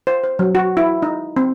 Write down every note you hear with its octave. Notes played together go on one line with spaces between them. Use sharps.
C5
C5
F#3
F#4
E4
D#4
C4